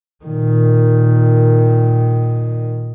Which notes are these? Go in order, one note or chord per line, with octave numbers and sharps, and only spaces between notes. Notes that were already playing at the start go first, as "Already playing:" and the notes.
A#2 D#3